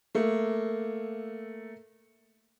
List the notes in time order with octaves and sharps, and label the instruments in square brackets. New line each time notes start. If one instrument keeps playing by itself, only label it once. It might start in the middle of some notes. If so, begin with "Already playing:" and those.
[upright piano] A3 A#3